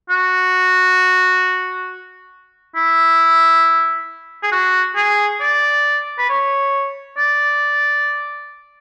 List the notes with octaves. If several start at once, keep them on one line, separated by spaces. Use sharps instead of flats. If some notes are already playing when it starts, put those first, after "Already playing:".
F#4
E4
G#4
F#4
G#4
D5
B4
C#5
D5